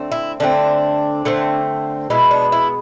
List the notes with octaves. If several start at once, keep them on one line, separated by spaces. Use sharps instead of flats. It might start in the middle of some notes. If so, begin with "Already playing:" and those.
Already playing: D3 A3 C4
E4
D3 A3 C4 D4
D3 A3 C4
B2 G#3 B3 E4
D4
E4